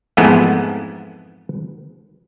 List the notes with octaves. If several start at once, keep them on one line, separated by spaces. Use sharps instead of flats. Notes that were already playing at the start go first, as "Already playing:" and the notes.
F2 G#2 E3 G#3 A3 B3